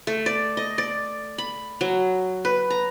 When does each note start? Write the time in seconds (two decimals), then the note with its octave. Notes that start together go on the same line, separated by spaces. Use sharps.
0.07 A3
0.26 D5
0.57 D#5
0.78 D5
1.38 B5
1.81 F#3
2.45 B4
2.70 A#5